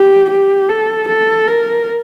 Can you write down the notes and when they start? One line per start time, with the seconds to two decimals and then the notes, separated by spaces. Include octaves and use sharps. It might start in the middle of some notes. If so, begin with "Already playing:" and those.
Already playing: G4
0.30 G4
0.69 A4
1.09 A4
1.47 A#4